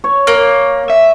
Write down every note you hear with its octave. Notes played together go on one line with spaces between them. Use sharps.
C#5
A#3
E5